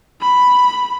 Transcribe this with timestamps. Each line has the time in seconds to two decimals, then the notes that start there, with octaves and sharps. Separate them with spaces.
0.22 B5